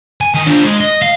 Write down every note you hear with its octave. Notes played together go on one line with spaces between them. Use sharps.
G#5
D#3
D4 F4
G#3
D#5
F5